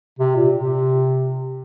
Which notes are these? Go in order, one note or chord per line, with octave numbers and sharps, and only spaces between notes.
C3
A#2
C3